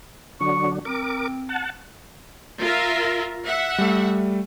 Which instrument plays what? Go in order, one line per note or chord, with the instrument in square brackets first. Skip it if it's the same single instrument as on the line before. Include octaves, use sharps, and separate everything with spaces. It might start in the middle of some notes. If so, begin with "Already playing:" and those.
[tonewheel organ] D3 F#3 D4 [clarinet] C#6
[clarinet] C4 [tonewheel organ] A#4 D6
[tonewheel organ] F#5 A5
[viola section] F4 A#4 E5
[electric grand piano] A#6
[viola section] E5 F#5
[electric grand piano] G3 A3